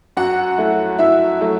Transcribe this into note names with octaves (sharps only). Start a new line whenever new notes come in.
F#2 F#4 F#5
F#3 A3 E4
F#2 E4 E5
F#3 A3 E4